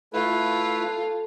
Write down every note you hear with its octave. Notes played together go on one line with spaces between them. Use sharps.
A3 E4 F4 A4 B4